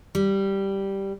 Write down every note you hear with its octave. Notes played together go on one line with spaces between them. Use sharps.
G3